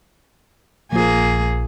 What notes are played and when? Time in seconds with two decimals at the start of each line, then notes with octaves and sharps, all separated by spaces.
0.92 A#1 F3 A#3 G#4